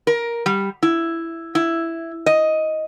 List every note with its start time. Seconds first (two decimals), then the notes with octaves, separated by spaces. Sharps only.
0.07 A#4
0.46 G3
0.83 E4
1.55 E4
2.26 D#5